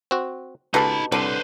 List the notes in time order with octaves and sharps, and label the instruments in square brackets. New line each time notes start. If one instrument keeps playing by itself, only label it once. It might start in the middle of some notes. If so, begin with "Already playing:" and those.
[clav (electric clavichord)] C4 F#4
[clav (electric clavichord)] C#2 [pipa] B2 [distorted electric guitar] D#4 B5 [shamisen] G4 A4
[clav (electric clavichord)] C2 [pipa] D3 [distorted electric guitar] B4 C5